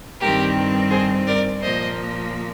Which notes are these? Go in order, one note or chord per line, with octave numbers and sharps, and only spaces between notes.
G2 D#3 G3 C4 G4 A#4
G#4 C5
A#4 D5
A#2 F3 A#3 C5 D#5